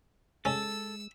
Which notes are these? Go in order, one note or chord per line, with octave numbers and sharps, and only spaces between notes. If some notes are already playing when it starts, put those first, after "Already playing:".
G#3 C#4 A4 E6